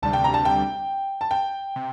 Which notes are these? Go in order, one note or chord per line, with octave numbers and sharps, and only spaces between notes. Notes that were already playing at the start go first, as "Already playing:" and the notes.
D2 C3 G3 D4 A5
G5
A#5
A5
G5
A5
G5
C3